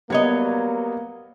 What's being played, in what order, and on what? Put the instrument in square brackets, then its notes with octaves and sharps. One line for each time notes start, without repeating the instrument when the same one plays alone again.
[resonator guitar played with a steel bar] F#3 C#5 D#5 [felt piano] G3 B3 [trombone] A#3